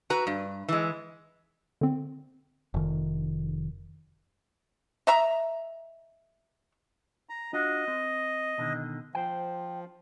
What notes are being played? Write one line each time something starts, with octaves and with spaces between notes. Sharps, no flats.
F#4 B4 A#5
G2
E3 G#3
D3 C4
F1 D#3
D#5 E5 A#5
A#5
D4 F4 F#4 D#5
C4
B2 D3 D#3
F3 C5 G5